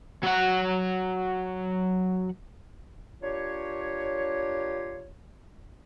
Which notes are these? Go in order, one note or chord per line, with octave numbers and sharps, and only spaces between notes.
F#3 F#5
A#3 D4 F4 G4 C#5